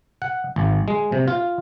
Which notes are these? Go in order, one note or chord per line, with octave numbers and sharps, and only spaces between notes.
F#5
G#1
G#3
C3
F4